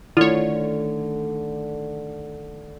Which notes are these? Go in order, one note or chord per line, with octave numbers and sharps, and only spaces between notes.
D3 D#3 A3 E4 F4 C#5